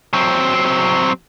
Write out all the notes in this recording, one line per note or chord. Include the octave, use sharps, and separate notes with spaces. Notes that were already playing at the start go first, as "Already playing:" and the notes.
F#3 C4